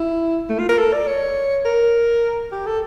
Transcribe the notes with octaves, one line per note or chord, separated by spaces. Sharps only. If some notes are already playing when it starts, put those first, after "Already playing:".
Already playing: E4
A3
F4
A#4
A4
D5
C#5
A#4
G4
A4